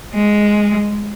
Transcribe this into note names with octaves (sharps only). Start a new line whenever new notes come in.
G#3